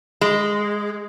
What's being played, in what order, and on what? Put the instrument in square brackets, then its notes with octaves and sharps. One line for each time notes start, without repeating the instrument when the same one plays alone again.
[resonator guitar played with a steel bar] G#3